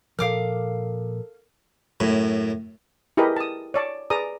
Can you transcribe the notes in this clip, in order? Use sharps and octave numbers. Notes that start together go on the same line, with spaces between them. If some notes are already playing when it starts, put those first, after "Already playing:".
A#2 F3 A4 A#4 F5 D6 F6
F#2 A2
E4 G4 G#4 A#4 B4 D#5
A5 D#6
C#5 D5 A5
G#4 B4 D5 A#5 D#6